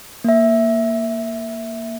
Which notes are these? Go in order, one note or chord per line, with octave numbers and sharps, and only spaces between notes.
A#3 E5